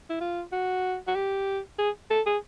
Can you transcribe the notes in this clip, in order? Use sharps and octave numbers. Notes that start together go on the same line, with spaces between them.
E4
F4
F#4
F#4
G4
G#4
A4
G#4